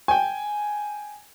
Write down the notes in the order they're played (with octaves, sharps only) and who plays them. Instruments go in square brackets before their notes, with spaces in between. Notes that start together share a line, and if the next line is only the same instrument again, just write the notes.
[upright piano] G5 G#5